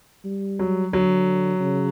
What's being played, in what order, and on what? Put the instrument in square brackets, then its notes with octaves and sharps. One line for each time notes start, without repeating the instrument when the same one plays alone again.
[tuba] G3
[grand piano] F#3
[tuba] D3 [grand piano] F#3
[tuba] C#3